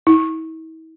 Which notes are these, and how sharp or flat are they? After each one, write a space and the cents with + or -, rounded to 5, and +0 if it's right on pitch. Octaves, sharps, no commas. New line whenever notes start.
E4 -45